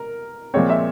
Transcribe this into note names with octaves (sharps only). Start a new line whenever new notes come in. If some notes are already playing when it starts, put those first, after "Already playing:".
Already playing: A#4
A#2 F3 G#3 C4 C#5
E5